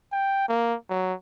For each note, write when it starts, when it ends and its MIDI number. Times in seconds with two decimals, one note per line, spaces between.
0.12 0.46 79
0.48 0.75 58
0.90 1.13 54